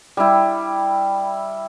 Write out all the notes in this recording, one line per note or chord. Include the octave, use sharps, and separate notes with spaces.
G3 E4